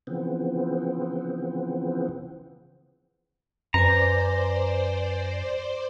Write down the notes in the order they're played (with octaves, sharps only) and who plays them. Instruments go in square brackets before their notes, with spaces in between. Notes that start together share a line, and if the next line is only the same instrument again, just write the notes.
[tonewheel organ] C#3 E3 F3 B3 C4
[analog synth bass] F#2 [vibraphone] B4 G#5 [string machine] C5 D5 [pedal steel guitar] A#5